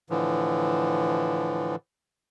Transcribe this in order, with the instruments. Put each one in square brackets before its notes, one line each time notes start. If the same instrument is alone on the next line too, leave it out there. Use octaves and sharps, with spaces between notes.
[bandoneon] A2 D3 E3 F3